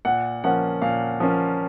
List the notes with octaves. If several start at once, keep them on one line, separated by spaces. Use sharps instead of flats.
A#2 F#5
F3 A#3 C#4 F#5
A#2 F5
F3 A#3 C#4